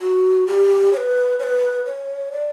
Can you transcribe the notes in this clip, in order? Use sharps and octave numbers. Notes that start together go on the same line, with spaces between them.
F#4
G4
C#5
B4
C#5
B4
C#5
D5